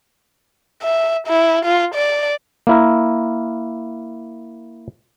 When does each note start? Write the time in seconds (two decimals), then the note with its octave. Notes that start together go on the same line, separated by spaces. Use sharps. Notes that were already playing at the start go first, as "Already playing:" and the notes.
0.83 E5
1.27 E4
1.65 F4
1.95 D5
2.67 A#3 E4 A#4